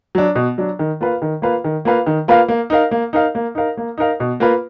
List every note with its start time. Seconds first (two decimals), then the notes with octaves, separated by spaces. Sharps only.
0.15 F#3 D4
0.35 B2
0.58 F#3 D4
0.79 D#3
1.01 A#3 F4 B4 F5
1.22 D#3
1.42 A#3 F4 B4 F5
1.64 D#3
1.85 A#3 F4 B4 F5
2.06 D#3
2.28 A#3 F4 B4 F5
2.48 A#3
2.70 D#4 A#4 F5
2.91 A#3
3.13 D#4 A#4 F5
3.35 A#3
3.55 D#4 A#4 F5
3.77 A#3
3.98 D#4 A#4 F5
4.20 B2
4.40 A#3 F4 B4